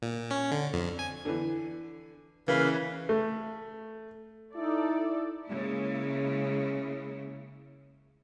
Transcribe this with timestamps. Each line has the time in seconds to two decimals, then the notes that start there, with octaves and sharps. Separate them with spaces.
0.02 A#2
0.31 C#4
0.52 D3
0.74 F2
0.99 G#5
1.25 D3 E3
2.48 C#3 E3 A#3 C#4 B4 F5
3.09 A3
4.55 D#4 E4 A4 D5
5.48 C#3 G#3 A#3 E4